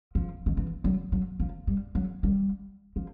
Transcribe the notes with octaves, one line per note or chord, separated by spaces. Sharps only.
F3
D#3
E3
F#3
F#3
F3
G3
F#3
G3
F3